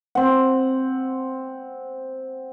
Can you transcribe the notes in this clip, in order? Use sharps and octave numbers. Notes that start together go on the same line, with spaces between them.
C4 F#5